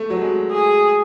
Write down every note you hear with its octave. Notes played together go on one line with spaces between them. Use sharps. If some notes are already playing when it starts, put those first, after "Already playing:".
Already playing: A3
F#3
G#3
G#4